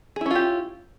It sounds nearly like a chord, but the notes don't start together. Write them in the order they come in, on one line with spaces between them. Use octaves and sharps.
G#4 E4 C#4 F4 G4